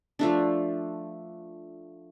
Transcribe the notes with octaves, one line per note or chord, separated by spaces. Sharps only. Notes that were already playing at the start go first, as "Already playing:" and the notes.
F3 A3 D4